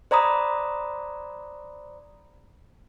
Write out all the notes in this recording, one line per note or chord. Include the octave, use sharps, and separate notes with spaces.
C5 D5 A#5 B5 D#6